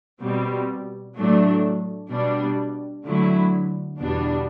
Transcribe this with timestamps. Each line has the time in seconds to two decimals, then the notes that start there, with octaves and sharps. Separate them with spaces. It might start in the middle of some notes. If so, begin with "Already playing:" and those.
0.22 B2 G3 C4
1.17 A2 F#3 A3 D4
2.11 B2 G3 D4
3.06 D3 F#3 A3 E4
4.00 E2 B2 G3 D4